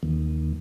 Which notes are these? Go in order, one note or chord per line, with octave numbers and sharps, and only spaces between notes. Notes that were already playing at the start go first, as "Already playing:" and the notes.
D#2